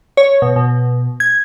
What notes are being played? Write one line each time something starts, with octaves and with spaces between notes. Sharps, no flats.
C#5
B2
B2
G#6